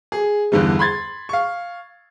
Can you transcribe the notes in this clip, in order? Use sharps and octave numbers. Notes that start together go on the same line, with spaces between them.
G#4
E2 G2 D3 E3 G3
B5 C6 G#6 A6
F5 C#6